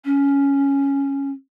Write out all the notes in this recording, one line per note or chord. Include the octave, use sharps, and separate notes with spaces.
C#4